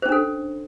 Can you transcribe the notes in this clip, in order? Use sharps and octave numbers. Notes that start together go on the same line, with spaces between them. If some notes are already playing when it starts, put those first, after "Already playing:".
C#4 D4 A4 C5